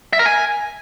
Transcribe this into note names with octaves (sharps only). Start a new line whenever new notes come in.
E5
A#4
G#5